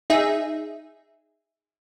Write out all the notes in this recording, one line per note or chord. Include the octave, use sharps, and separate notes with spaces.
D#4 G#4 E5